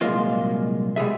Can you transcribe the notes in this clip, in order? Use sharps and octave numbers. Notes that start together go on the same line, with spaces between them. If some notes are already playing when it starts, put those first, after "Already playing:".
C2 A#2 F#3 G#3 A#3 F4
B2 G3 G#3 G#4 E5